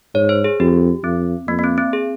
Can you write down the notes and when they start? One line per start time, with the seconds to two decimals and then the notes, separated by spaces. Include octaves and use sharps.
0.14 G#2 C#5
0.29 C5
0.44 G#4
0.60 F2 G4
1.04 F2 C4
1.48 F2 A#3
1.59 A#3
1.64 C4
1.78 C4
1.93 G#4